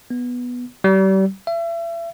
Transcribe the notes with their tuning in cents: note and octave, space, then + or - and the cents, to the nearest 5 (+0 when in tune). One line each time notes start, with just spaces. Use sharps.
B3 -5
G3 -35
E5 +35